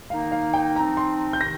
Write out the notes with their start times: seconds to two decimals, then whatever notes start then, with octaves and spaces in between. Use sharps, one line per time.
0.10 D#3 A#3 D#4 F5
0.32 F5
0.54 G5
0.76 F3 C4 D#4 A#5
0.97 C6
1.33 G6
1.41 C3 D#3 A#6